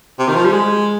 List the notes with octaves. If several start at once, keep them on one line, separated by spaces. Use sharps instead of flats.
C3
D#3
F3
G3
G#3